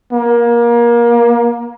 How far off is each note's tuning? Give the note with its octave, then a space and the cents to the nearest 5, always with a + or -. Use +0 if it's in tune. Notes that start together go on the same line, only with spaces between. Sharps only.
A#3 +25